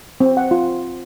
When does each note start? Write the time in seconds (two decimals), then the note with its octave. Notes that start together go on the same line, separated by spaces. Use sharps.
0.20 C4
0.37 F#5
0.51 F4